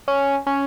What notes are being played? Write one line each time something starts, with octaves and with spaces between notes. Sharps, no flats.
C#4
C#4